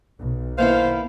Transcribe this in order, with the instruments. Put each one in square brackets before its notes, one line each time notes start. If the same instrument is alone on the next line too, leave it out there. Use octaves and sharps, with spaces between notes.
[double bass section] B1
[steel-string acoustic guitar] D#2 B3 E4 [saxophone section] C5 F5